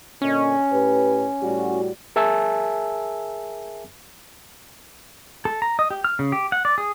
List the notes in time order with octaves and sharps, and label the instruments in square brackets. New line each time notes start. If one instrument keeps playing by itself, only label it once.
[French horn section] A#2 D3 D#5 [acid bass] C#4
[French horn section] A2 G4 B4
A2 G3 F#4
[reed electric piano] G#4 A#4 E5 G#5 A5 E6
[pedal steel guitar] A4
A#5
D#5
G4
F6
C#3
G4
F#5
D5
G#4